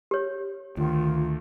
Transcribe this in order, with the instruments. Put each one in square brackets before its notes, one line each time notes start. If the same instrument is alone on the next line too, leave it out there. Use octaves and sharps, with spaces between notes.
[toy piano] G4 C#5
[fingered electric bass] D2 [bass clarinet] D#3 [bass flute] F4